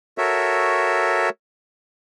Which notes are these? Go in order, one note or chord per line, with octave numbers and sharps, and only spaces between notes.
F#4 A4 A#4 C#5 E5